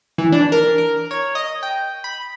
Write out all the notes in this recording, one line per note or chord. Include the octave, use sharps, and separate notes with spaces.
E3
D4
A#4
A#4
C#5
D#5
G5
B5